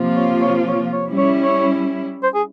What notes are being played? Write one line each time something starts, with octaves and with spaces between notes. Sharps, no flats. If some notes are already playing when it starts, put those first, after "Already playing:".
Already playing: C3 F3 A#3 F4
C#5
C#5
C#5
C#5
G3 C#4 E4
C#5
C#5
C5
G#4